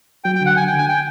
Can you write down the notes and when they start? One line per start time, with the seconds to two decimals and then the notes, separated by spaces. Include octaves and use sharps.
0.24 F#3 G5
0.35 G5
0.41 D3
0.46 F#5
0.56 D3 G#5
0.67 G5
0.73 D3
0.78 G#5
0.89 G5